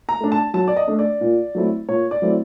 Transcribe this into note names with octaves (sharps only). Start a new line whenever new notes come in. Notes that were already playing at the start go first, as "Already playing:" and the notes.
A#5
A3 D4
A5
F#3 A5
D5
D#5
A3 D4
D5
A#2
F#3 A3 C4 E4
A#2 C#5
D5
F#3 A3 C4 E4